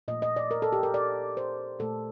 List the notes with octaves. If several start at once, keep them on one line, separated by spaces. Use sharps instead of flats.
A#2 F3 A3 D#5
D#5
D5
A#4
A4
G4
A#4
D5
C5
A#2 A3 A4